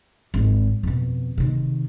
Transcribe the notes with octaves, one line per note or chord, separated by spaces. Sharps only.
G#1 G#3
F2 B2
C3 D#3